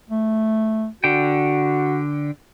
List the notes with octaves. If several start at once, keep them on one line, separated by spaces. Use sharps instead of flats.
A3
D3 F#4 G5